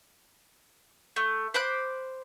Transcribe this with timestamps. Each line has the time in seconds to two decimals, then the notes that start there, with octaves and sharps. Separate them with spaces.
1.16 A3
1.54 C5 B5 D6 F#6